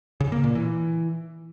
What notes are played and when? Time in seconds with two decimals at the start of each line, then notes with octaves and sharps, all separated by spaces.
0.20 C#3
0.32 A#3
0.44 A#2
0.55 E3